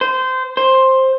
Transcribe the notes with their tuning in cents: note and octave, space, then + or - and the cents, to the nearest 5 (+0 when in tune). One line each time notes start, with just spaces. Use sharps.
C5 -20
C5 +10